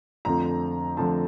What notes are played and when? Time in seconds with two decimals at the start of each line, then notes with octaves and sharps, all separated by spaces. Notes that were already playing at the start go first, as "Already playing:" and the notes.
0.25 F2 D3 F3 A3 C4 A#5
0.97 F2 D3 F3 A3 C4 A5